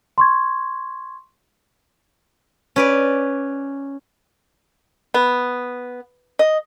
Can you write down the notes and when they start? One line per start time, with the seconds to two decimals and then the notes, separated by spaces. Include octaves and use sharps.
0.18 C6 C#6 G#6
2.76 C#4 B4 D5
5.14 B3
6.39 D#5